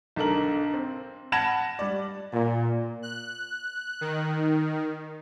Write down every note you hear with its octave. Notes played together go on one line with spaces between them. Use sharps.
B1 D3 A4 A#4 F#7
C4
F#5 A5 B5 G#6 A#6 E7
G3 D5
A#2
F#6
D#3